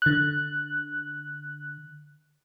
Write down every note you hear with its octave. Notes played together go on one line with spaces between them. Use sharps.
D3 F#6